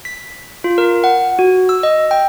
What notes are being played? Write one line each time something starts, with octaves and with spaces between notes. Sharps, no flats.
B6
F4
A#4
F#5
F#4
E6
D#5
G5